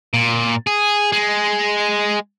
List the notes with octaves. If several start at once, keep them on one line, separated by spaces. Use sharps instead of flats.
A#2
G#4
G#3